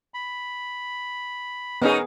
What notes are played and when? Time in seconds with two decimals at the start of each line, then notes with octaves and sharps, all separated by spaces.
0.14 B5
1.82 G#3 B3 C#4 D#4 G#4 A#4